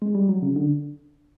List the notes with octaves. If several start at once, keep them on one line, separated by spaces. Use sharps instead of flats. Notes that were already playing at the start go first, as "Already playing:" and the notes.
G#3
G3
F#3
C#3
D3